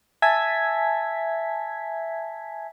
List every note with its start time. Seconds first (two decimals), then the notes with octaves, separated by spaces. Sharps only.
0.22 E5 G#5 A5 G#6 B6